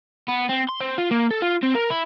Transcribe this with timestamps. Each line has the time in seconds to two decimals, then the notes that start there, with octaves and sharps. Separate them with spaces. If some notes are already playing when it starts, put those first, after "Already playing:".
0.28 B3
0.49 C4
0.69 C6
0.80 C4
0.98 F4
1.11 A#3
1.31 A4
1.42 F4
1.63 C4
1.75 A#4
1.90 E4